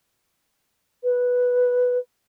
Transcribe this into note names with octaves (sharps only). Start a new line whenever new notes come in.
B4